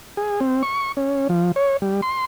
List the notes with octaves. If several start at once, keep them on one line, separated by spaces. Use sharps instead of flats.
G#4
C4
C#6
C#4
F3
C#5
G3
C6